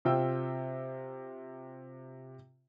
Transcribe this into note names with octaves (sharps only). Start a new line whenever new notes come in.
C3 F4 G5 E6